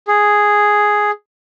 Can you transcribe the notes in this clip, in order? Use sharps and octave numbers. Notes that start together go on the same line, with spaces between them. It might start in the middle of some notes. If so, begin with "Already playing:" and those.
G#4